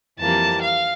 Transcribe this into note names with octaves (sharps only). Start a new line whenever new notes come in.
F2 E3 G3 A#3 A5
F5